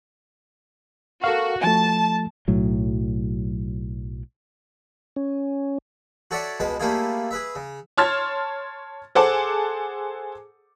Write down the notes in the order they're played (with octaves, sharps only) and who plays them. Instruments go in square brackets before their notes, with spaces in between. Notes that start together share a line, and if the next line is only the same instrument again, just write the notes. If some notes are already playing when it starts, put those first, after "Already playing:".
[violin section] F#4 [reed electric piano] A4 A#4 F5
[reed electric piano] F3 A3 [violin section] A5
[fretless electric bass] B1 A2 F#3
[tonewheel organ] C#4
[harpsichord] F#4 A4 C#5 D5 E5 F#5
C#2 B2 G#3 B4 A5
G3 A3 A#3 E4 F4 G#4
G#4 B4 E5
C#3
[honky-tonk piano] C#5 A5 C6 F6 G#6 A6
G#4 A4 C5 F#5 A5 D6